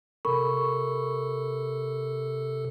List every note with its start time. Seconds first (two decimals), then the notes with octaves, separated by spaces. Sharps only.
0.25 C3 A4 A#4 B5 C#6